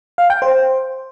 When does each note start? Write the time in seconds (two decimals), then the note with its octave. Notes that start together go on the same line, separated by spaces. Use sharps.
0.18 F5
0.30 G5
0.42 C5